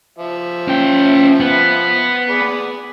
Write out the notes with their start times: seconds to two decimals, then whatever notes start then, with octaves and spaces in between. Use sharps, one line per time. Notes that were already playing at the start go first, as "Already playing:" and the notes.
0.18 F3 E5
0.68 C#4 G5
1.40 B3
2.30 G#4 B4 D5